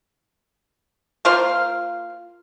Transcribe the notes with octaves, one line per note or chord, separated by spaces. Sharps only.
A#3 F4 C5 F5